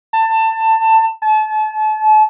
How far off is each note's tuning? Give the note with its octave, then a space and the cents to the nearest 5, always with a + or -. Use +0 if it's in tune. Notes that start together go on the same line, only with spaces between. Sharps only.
A5 +20
A5 -35